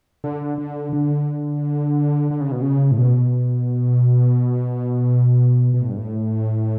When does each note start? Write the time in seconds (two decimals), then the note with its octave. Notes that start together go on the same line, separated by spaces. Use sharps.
0.24 D3
0.58 D3
0.93 D3
2.31 D3
2.40 C#3
2.52 B2
2.62 C#3
2.91 A2
2.98 B2
5.74 B2
5.82 A2
5.89 G2
5.97 A2